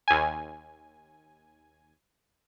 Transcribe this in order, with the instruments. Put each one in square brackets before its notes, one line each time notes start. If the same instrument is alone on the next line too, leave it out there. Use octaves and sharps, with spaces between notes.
[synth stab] D#2 G#5